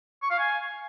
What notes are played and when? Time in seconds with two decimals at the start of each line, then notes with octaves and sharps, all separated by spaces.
0.22 C#6
0.31 F5
0.39 G#5